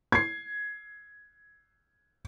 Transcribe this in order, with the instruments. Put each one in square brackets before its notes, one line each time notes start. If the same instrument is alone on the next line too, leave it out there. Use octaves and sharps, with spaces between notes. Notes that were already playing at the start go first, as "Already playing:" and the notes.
[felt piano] G#6 C7